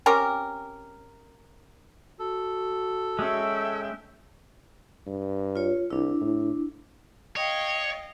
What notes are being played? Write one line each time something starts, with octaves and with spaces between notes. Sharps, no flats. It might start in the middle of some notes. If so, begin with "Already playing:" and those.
C4 C#4 G4 A#4
F#4 A4
G#3 C#4 E5 G5
G2
F4 C#5
C2 D4 E4
A2
C#5 D#5 F5 G5